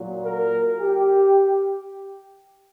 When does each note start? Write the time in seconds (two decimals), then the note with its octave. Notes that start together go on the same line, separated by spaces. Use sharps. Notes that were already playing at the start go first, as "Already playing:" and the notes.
Already playing: A#2 F#3
0.24 A#4
0.80 G4